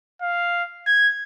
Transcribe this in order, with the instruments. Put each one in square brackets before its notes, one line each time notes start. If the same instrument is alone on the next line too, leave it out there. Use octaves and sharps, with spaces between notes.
[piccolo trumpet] F5
G#6